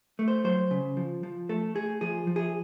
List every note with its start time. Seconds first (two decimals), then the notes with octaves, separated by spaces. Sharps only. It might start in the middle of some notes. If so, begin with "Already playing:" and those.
0.19 A3
0.28 C5
0.44 F#3 C5
0.71 C#3
0.97 F3
1.23 F3
1.49 A3 A4
1.75 A3 G#4
2.01 F3 G#4
2.27 F3
2.36 G#4